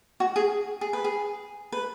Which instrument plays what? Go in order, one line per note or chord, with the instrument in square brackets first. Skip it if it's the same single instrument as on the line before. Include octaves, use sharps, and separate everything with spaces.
[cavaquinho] F#4
G#4
G#4
B4
G#4
B4